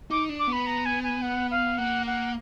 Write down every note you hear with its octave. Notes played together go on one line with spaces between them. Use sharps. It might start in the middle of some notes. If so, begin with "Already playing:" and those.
D#4 D6
D4
D6
B3
B5
A#5
G#5
G#5
F#5
F5
A#3 F#5
F#5